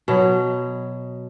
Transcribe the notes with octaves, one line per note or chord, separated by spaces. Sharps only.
B2 F#3